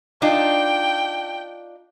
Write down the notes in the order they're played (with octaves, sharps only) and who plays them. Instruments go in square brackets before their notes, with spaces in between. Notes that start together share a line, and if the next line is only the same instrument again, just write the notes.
[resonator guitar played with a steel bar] D4 D#4 F4 [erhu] G5